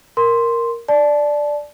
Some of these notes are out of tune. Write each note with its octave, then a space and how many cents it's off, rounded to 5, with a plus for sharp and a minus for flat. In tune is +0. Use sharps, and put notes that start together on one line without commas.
A#4 +0 C6 +0
D5 +0 A5 -25